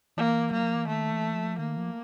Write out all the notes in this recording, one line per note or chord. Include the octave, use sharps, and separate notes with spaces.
E3 A#3
F#3 A#3
F3
E3
D#3 A3
E3
F3
D#3 A#3
F3